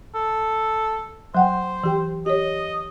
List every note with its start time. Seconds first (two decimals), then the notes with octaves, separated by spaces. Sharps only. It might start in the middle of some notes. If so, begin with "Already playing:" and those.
0.15 A4
1.35 F#3 C5 F#5 G5
1.84 E3 G4 G5
2.26 G4 C#5 D#5